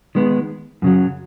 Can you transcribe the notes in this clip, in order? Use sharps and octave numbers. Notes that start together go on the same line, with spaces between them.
D#3 G#3 B3
F#2 C#3 F#3